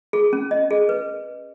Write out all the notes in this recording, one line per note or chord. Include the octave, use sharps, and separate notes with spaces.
G#4
C#4
D#5
G#4
B4